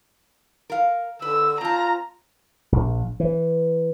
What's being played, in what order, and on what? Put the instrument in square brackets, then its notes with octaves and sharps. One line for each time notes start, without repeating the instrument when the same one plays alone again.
[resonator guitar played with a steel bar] A#4 F5
[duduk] D3 [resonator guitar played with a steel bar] B4 [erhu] E6
[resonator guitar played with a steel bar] C4 A5 [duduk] F4 [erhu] A#5
[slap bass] A#1
E3